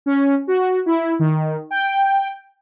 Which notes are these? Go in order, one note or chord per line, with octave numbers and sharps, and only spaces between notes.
C#4
F#4
E4
D#3
G5